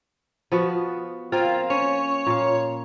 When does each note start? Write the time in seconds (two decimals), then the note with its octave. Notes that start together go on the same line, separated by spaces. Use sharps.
0.52 F3 B3 F#4
1.32 A#3 C4 F4
1.70 C#4 C#5
2.26 A#2 F5